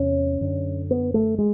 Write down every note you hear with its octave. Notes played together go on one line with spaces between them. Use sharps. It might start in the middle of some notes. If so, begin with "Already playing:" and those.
Already playing: E2 C3 C#4
F#2 D3
B3
A3
G#3